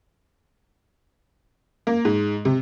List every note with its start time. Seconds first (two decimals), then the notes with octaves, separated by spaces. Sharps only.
1.87 A#3
2.05 G#2
2.45 C3